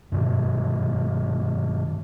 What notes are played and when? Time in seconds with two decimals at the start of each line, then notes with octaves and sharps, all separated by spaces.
0.12 G2 B2 D#3